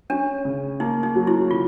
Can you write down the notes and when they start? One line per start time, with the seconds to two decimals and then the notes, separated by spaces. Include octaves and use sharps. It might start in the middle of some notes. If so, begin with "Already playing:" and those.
0.10 C#4 D4
0.45 C#3
0.80 A#3 D#4
1.03 D#4
1.15 F#3
1.27 E4
1.50 C#3 F4